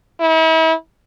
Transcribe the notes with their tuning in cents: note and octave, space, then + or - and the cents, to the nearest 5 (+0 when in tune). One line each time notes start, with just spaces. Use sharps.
E4 -40